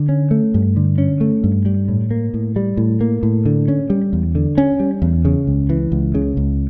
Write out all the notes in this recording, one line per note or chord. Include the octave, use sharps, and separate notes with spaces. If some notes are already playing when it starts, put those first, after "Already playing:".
Already playing: D3
C#4
A3
G2
D3
C#4
A3
G2
G3
A2
A#3
A2
G3
A2
A#3
A2
D3
C#4
G3
E2
D3
C#4
G3
E2
C#3
C#2
E3
C#2
C#3
C#2